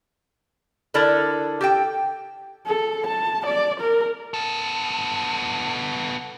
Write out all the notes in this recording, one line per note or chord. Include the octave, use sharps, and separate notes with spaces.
D3 E4 A4 A#4 D5
G4 A4 G5
A4
A5
D5
A#4
B3 A4